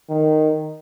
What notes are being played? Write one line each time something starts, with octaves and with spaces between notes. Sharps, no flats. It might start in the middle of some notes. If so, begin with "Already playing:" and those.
D#3